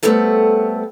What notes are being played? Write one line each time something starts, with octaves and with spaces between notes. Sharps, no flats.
G3 A3 B3 C4 A4 F#5